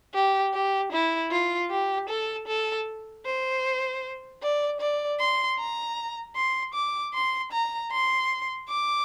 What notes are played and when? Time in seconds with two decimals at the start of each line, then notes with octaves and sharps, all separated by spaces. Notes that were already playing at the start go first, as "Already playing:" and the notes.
0.15 G4
0.54 G4
0.92 E4
1.31 F4
1.71 G4
2.09 A4
2.48 A4
3.26 C5
4.43 D5
4.81 D5
5.20 C6
5.59 A#5
6.36 C6
6.75 D6
7.14 C6
7.52 A#5
7.91 C6
8.69 D6